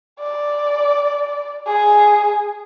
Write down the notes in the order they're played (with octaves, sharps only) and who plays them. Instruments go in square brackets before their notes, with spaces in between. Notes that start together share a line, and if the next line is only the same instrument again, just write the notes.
[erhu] D5
G#4